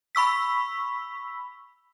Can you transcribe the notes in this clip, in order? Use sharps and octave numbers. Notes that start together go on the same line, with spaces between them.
B5 C#6 E6 B6